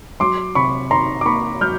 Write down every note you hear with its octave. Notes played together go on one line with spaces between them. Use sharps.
F#3 C6 D6
C3 B5 C#6
D#3 A#5 C6
D6
A#3 B5 C#6
F#3 F6 G6